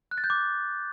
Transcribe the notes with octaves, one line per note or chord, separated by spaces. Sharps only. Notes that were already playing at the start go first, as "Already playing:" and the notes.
F#6
A6
G6
D6